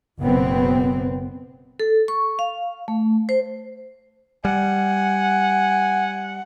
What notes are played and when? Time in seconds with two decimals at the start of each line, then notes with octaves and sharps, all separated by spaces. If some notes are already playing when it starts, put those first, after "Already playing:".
0.21 F#1 F#2 B2 B3 C4
1.80 A4
2.08 C#6
2.39 F5
2.88 A3
3.29 C5
4.45 G3 F#5 G#5